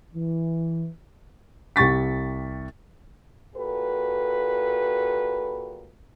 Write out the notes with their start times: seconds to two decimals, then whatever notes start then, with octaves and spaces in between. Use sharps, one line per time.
0.13 E3
1.76 C2 G4 C#6 A6 B6
3.55 A#2 F#4 G4 A4 B4